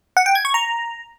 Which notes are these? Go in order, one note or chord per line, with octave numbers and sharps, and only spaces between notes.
F#5
G5
G#6
C#6
A#5